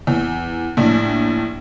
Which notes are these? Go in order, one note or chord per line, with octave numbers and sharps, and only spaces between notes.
E2
A#1 A2